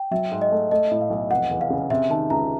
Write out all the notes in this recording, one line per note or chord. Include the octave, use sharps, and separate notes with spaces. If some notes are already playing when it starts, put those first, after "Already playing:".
Already playing: G5
F#3 E5
G#2
D#5
A3
A3 D#5
A2
F5
B1
F1 F#5
E2
F5
C#3
C3 E5
D#3 A5
C#2 A#5